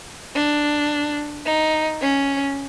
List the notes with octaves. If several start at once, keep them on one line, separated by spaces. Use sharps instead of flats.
D4
D#4
C#4